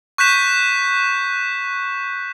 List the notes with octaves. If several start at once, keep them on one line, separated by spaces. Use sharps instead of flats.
C#6 F#6 G6 B6 E7